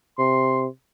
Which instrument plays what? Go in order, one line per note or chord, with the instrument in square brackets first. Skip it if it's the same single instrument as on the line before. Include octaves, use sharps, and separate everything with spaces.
[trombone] C3 [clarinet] C6